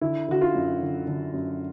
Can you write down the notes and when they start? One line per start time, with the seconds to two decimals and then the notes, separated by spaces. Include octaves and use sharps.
0.01 D3 E4
0.29 D3 F#4
0.41 F4
0.54 F#2
0.81 D3
1.07 D3
1.34 F#2